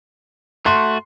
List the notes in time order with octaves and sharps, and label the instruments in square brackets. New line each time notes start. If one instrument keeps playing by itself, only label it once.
[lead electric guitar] A3 F#4 [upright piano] C6